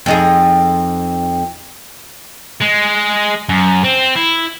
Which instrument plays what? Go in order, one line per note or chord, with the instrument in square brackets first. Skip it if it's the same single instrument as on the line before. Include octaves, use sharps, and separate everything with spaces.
[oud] F2 D#4 G#4
[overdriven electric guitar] G#3
F#2
C4
E4